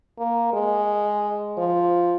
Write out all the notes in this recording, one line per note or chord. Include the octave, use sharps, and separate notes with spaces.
A#3
G#3
F3